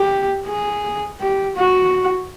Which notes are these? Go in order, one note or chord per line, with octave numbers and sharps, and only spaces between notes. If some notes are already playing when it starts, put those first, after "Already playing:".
Already playing: G4
G#4
G4
F#4